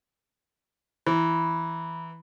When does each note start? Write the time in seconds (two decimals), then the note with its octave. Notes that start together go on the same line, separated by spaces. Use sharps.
1.06 E3 A#5 B5